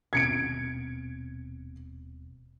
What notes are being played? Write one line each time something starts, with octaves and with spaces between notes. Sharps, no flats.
D#1 B2 C4 G#6 C#7 D7